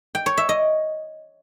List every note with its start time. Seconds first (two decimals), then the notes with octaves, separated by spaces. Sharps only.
0.15 G5
0.26 C#5
0.37 E5
0.49 D#5